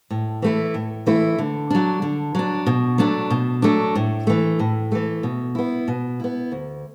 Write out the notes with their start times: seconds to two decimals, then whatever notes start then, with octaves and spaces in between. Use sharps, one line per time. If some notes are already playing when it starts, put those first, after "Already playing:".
0.10 A2
0.42 E3 A3 E4
0.74 A2
1.07 E3 A3 E4
1.38 D3
1.70 F#3 D4
2.02 D3
2.35 F#3 D4
2.66 B2
2.98 F#3 A3 D4
3.30 B2
3.62 F#3 A3 D4
3.95 A2
4.27 E3 A3
4.59 A2
4.92 E3 A3
5.23 B2
5.55 B3 E4
5.88 B2
6.20 B3 E4
6.52 D2